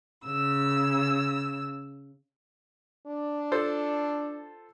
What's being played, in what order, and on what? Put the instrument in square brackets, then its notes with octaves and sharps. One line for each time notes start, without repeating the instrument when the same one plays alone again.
[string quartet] C#3 E6
[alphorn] D4
[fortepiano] F4 A4 C5